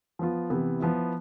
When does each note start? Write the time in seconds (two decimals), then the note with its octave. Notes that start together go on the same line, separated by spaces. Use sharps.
0.19 F3 B3 F4
0.50 C3 E3 B3
0.80 F3 B3 E4